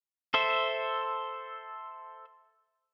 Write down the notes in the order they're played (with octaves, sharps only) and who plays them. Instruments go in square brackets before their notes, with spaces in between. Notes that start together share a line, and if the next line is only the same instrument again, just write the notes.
[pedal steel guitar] A4 C5 E5